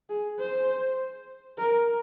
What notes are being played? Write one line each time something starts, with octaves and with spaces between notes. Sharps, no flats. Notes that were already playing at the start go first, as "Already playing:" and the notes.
G#4
C5
A#4